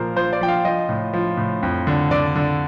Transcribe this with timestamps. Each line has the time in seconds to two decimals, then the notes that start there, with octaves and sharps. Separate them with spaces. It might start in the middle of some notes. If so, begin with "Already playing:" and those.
Already playing: A#2 F3 A#4 C5
0.16 F3 C5
0.33 D5
0.41 F3 G5
0.48 F5
0.65 F3 D#5
0.89 A2
1.13 F3
1.37 A2
1.63 F2
1.87 D3
2.11 D3 D5
2.35 D3